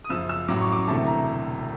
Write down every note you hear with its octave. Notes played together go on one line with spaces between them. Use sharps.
D#6
F#2 C#3 F3 E6
E6
A1 A2 F#3 D6
C#6
D6
E1 D2 C3 E3 A3 A5
A#5